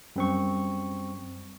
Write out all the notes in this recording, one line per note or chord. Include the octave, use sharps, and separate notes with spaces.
F#2 G3 C4 C#6